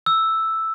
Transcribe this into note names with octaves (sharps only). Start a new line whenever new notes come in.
E6